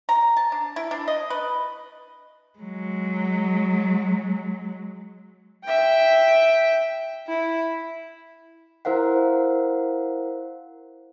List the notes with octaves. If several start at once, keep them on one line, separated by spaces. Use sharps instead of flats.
A#5
A5
D4
E4
D4
D#5
B4
F#3 G#3
E5 G5
E4
E4 A#4 C5 F5 F#5